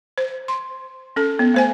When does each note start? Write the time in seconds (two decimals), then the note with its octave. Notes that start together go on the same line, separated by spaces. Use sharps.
0.18 C5
0.48 C6
1.16 C#4 A4
1.39 B3
1.54 A3 C5 G#5